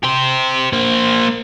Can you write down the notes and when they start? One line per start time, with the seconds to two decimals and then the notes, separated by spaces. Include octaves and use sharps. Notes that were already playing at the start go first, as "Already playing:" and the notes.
0.03 G4 C5
0.73 A#3 C5